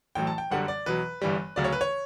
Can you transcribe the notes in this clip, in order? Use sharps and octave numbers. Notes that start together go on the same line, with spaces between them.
A1 A2 F#3 G5
A5
G5
G1 F#2 D3 G3 F#5
D5
E2 B2 F#3 B4
G1 G2 E3 G3
D2 C#3 F#3 D5
C#5
B4
C#5